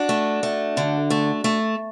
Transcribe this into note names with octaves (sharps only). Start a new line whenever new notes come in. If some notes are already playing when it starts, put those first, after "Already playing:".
Already playing: D4 F#4
A3
A3
D3
A3
A3